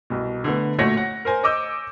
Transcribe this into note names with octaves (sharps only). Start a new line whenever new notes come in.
C2 B2
D3 A3 B3
A1 A#2 A3 F#4 C#5 A#6
F#5
A#4 C5 G#5
C#5 D#5 D6 E6 G6